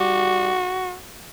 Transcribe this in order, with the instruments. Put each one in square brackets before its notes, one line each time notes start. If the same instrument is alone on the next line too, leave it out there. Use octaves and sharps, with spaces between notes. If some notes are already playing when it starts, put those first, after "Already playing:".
Already playing: [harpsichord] G3 [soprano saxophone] F#4